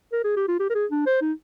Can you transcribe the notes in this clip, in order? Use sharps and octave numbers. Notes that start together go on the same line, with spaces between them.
A#4
G#4
G4
F4
G4
A#4
G#4
D4
C5
D#4